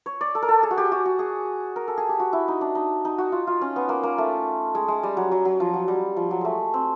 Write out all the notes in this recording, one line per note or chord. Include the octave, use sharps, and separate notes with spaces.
C#5
D5
A4
A#4
A4
G#4
F#4
G4
F#4
F#4
G#4
A#4
A4
G#4
G4
F#4
E4
D#4
D4
D#4
D#4
F#4
F4
F4
C#4
B3
A#3
A#3
A3
G#3
G#3
G3
F#3
F#3
F#3
F3
F#3
G3
F3
F#3
G#3 A3
C4